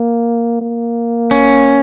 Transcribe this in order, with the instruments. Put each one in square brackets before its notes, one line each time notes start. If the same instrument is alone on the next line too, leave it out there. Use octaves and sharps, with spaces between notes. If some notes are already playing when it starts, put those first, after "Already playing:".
Already playing: [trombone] A#3
A#3
[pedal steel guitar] C#4